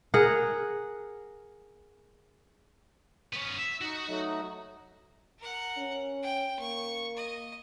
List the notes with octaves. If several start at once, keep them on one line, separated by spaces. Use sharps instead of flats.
G#4 A#4 F#5
B3 C#4
E5
D#4 F#4
F#3 A3 D#4
A#4 F#5
C#4
G5
A#3 C#6
D#5